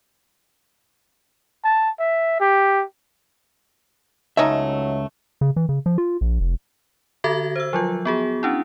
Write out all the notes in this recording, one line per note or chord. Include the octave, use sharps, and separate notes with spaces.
A5
E5
G4
C#2 F#3 A3 C#4 D#4 E5
C#3
E3
C#3
F3
F4
A#1
F1
D3 F#4 A4 E5 G#6 A#6
C5 E6
F3 F#3 F4
B3 F#4 G#4
C#4 D4 E4